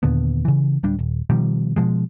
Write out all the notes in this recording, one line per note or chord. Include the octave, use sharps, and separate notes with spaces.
D#2 A#2 D3 B3
C#3 E3
D1 G3 D4
D#1
B2 D#3 F3 G3
B2 F3 G#3